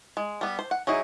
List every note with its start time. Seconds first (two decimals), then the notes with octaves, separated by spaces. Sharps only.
0.17 G#3
0.41 G3 B3
0.59 C5
0.71 F#5
0.87 F#3 D#4 E4 G#4